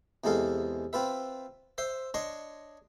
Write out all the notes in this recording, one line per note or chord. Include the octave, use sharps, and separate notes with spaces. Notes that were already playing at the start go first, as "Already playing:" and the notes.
E2 C3 G#3 A4 F5
C4 F4 B4 E5
C5 E5 C6
D4 C#5 D#5 C6 C#6